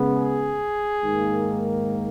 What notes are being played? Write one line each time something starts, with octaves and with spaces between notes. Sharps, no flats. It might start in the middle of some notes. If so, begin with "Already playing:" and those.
Already playing: C#3 G#3 B3
G#4
G#2 D#3 A#3